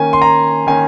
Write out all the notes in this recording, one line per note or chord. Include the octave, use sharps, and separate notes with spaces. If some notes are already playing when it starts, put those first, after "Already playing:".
Already playing: D#3 A#3 C#4 G#5
C6
A#5
D#3 A#3 C#4 G#5